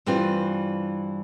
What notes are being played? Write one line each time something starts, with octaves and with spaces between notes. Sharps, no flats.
G2 E3 G3 C4 F4